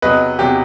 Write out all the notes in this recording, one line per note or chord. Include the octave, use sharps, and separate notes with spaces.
E2 C3 F#3 B4 D#5
E2 C3 F#3 G4